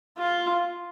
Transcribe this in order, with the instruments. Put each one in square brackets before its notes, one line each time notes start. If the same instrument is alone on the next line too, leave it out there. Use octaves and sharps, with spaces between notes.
[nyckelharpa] F4